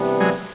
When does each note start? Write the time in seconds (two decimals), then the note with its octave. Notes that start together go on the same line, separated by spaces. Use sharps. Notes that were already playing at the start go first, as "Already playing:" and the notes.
Already playing: C3 E3 G3 B3 D4
0.20 F#3 G#3